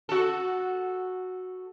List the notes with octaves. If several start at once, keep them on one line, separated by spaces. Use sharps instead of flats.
F#4 A4